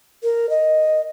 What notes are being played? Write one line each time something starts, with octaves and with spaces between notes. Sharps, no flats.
A#4
D#5